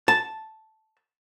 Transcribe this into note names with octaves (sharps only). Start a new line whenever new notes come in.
A5